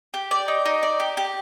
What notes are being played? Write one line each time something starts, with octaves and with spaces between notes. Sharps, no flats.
G4
D5
D#4
D#4
D5
G4
G4